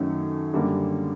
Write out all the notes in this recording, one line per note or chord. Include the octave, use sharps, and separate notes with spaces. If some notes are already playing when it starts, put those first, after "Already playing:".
Already playing: F#2 D#3 F#3 A3 C#4
F#2 D3 G3 A#3